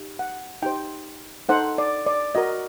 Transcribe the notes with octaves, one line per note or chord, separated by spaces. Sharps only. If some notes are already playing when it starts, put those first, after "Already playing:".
Already playing: D#4 G4
F#5
D#4 G4 C5 G5
D#4 A4 C5 F#5
D5
D5
F#4 A#4 D#5